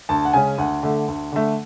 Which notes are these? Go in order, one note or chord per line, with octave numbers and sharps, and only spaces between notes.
D2 A5
F#5
C#3 G#3 C#4 G#5
D2 F#5
D3 A3
D2
D3 A3